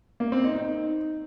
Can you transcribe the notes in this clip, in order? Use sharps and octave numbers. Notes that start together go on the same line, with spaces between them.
A#3
C4
D#4
D#4